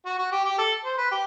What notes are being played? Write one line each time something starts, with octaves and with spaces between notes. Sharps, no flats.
F#4
F#4
G4
G4
A4
C5
B4
G4